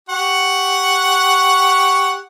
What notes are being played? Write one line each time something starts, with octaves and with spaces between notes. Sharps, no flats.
G4 F#5 C#6